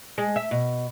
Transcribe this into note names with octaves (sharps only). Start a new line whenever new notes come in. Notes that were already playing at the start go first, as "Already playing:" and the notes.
G#3
E5
B2